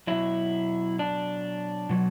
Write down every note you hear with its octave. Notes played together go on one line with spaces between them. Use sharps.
B2 F#3 E4
D4
B2 F#3